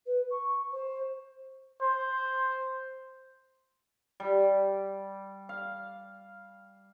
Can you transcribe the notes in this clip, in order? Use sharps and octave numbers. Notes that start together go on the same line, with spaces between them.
B4
C#6
C5
C5
G3
F5